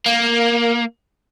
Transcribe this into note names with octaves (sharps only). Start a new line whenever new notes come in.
A#3